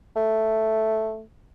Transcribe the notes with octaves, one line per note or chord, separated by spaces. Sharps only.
A3